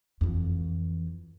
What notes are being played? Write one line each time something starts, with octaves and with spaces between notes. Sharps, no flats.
F2 E3